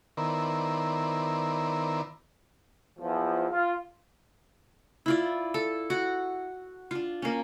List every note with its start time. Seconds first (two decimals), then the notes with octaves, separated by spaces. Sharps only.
0.17 D#3 B3 E4 A#4 C5 D5
2.99 E2 F3
3.50 F4
5.06 E4 F4 D5
5.54 A4
5.90 F#4
6.91 D4 F4
7.22 A#3 C#4